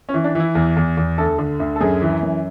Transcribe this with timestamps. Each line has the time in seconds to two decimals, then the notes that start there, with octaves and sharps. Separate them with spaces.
0.09 C#4
0.14 E3
0.24 D4
0.35 E3 E4
0.55 E2
0.76 E2
0.97 E2
1.18 D2 A4
1.38 D3
1.60 D2
1.76 A4
1.81 F#2 G#4
2.02 E3
2.22 F#2